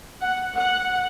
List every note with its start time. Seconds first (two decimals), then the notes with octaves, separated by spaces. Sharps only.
0.21 F#5
0.57 F#5